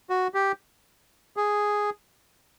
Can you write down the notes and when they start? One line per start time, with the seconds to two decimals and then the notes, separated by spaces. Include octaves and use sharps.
0.10 F#4
0.34 G4
1.37 G#4